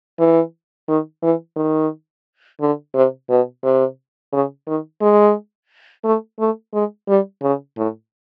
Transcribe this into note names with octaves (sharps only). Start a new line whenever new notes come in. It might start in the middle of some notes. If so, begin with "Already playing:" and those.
E3
D#3
E3
D#3
D3
C3
B2
C3
C#3
D#3
G#3
A3
A3
G#3
G3
C#3
A2